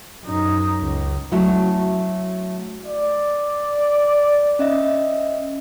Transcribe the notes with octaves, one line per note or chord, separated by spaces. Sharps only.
F#2 D#4
C#2
F#3 A3 C#4 E4 F#4
D5
C#4 D#5 E5